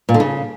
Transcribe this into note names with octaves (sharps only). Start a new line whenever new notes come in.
A#2
D3
C#3